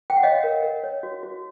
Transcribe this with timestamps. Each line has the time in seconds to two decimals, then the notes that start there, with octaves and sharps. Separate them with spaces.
0.10 G5
0.17 F#5
0.23 C#5 D#5 F5
0.44 A#4
0.63 A#4
0.84 C#5
1.03 F#4
1.23 F#4